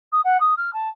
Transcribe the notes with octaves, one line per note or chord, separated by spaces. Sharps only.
D#6
F#5
D#6
F6
A5